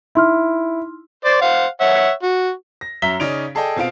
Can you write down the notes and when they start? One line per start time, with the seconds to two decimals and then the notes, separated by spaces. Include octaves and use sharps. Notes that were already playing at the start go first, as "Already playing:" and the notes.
0.15 D#4 E4 C6 F6
1.25 C5 D5
1.41 C5 F5 F#5
1.81 C#5 E5 F#5
2.23 F#4
2.81 A#6
3.02 F#2 E5 A#5 B6 G7
3.20 C#3 C#4 D#4 D5 D7 F7
3.55 G#4 A4 D5 D#5 G5
3.76 B2 C4 F4 F5 D7